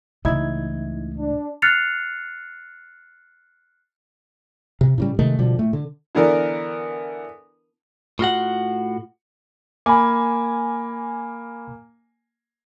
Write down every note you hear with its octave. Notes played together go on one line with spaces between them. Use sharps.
C#2 A2 C#3 E3 D#4 E4 G#6
D4
F6 F#6 A6 C7 C#7 F7
C3
A2 C#3 G3
C3 D#3 G#3 A3
B2 D3 F3 G3
A2 A3
D3
D3 E3 B3 D4 A#4
A2 F4 F#4 F#5
A#3 G#5 B5 D6